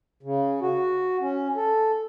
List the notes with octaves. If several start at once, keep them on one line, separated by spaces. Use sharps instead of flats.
C#3
F#4
C#4
A4